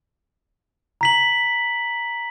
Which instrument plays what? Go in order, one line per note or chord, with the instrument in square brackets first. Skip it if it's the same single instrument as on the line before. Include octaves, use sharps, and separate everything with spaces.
[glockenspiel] A#5 B6 F#7